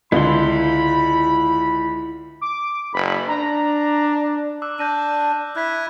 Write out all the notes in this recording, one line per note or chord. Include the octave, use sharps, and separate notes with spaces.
C#2 D3 E4 B5 C6
D6
F#1 B5
D4 A#5
D6 E6 F#6
D4 G6 A#6 D#7
E4 F#6 G#6 B6